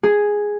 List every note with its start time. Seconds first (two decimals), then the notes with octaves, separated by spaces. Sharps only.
0.03 G#4